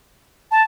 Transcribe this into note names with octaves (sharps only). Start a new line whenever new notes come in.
A5